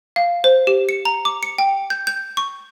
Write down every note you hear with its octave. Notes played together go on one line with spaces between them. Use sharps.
F5
C5
G4
C#7
A#5
D6
C#7
G5
G6
G6
C#6